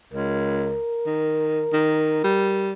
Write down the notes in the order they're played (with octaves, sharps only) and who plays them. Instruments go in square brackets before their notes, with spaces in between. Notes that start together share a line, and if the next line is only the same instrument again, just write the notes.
[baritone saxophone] C#2 [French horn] A#4
[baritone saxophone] D#3
D#3
G3